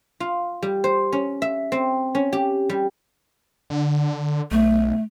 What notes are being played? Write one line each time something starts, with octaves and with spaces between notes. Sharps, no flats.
F4
G3
C5
C#4
E5
C4
C#4
G4
G3
D3
B1 A3